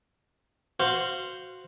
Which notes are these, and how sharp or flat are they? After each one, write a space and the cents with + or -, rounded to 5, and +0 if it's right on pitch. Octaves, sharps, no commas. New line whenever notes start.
F#4 -5 C5 +0 F5 -15